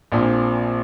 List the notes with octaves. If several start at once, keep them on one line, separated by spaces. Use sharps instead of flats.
A#1 A#2 F3 C4